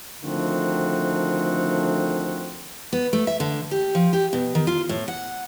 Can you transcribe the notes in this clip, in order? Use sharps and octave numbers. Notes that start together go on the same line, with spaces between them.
D3 D#3 F3 A3 C4 F#4
B3
A3
E5
D3
G4
F3
G4
B2
D#3
F4
A2
F#5